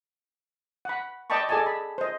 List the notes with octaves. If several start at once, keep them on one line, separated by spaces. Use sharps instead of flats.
F#5 B5
D5 D#5 G5 A5 B5 C#6
G#4 A4 D5 D#5 G#5 A5
B5
C5 D#5